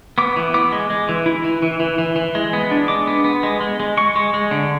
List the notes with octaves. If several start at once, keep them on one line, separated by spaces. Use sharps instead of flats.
B3 D6
E3
B3 D6
G#3
G#3
E3
E4
E3
E3
E3
E3
E3
G#3
B3
D4
G#3 D6
B3
B3
G#3
G#3
G#3
G#3 C#6
G#3
G#3
D3